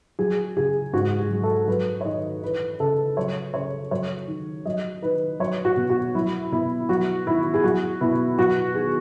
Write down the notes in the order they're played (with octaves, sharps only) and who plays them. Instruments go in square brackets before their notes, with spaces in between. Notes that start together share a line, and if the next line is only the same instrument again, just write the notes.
[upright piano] F#3 G#4
C#3 G#4
G#2 F#4
G#4
F#3
A4
F#3 B4
C#5
D#3 D#5
E3 B4
C#3 A4
F#3 C#5
C#3 C#5
F#3 C#5
D#3
F#3 D#5
D#3 B4
F#3 C#5
F#4
B2
F#4
F#3 E4
B2 E4
F#3 F#4
D#3 E4
G#4
F#3 F#4
B2 E4
F#3 F#4
D#3 G#4